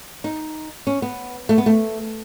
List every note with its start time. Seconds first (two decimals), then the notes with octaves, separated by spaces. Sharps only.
0.24 D#4
0.87 C#4
1.02 B3
1.49 A3
1.58 B3
1.66 A3